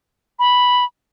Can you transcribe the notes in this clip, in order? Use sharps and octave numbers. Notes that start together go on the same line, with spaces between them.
B5